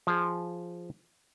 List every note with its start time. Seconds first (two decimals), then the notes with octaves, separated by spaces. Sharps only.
0.07 F3 G#4